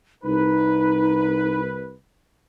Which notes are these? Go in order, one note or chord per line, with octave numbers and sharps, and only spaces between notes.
C2 D#4 B4